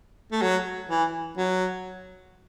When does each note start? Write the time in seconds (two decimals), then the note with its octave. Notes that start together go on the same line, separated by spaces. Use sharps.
0.32 A3
0.42 F#3
0.89 E3
1.37 F#3